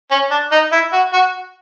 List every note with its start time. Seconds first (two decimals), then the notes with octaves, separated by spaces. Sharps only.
0.11 C#4
0.31 D4
0.52 D#4
0.72 E4
0.93 F#4
1.13 F#4